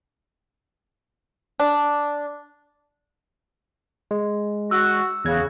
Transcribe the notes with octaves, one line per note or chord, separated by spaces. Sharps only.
D4
G#3
F#4 E6
E2 C#3 F#4 G#6